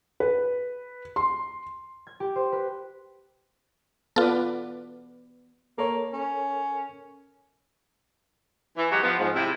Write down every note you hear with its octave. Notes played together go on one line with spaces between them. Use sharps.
B4
C6
G#6
G4
C5
B4
B3 F4 A4 B4 D5
A#3 A4 A#4 C#5
C#4
E3
F#3 G#3 F#4 G4
F3 B3
G#2 F3
C3 E4